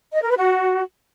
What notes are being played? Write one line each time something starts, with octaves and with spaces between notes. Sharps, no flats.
D#5
A#4
B4
F#4